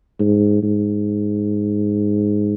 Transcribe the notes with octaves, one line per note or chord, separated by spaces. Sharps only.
G#2
G#2